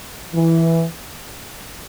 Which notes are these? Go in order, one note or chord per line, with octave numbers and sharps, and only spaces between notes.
E3